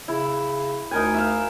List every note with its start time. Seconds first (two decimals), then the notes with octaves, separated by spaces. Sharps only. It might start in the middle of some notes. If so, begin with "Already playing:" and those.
0.08 C#3 E4
0.91 D2 D#4 A#4 G#5
1.14 E5 F5